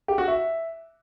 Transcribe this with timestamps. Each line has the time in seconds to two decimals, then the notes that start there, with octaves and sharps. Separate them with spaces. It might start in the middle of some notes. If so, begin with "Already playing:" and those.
0.08 G4
0.18 F#4
0.28 E5